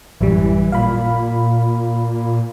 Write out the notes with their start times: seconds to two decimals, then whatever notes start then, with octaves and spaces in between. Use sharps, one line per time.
0.21 A1 F#2 E3 G3
0.72 A#2 F5 B5